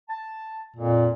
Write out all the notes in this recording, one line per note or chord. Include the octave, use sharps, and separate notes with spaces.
A5
F2 A#2